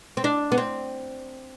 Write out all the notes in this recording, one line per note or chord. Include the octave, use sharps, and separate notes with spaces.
C4
D4
B3
C4